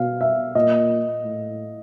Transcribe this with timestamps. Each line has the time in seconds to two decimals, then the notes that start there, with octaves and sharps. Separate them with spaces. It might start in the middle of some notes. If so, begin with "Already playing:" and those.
Already playing: B2 F5
0.21 E5
0.55 A#2 D#5
1.24 A2